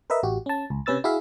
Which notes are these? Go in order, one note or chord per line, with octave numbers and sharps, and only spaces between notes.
A#4 B4 D#5 E5
A1 F#4 G4
C#4 A5
C#2
C3 C#4 B4 E6 A6
E4 F#4 G#4 E5 F5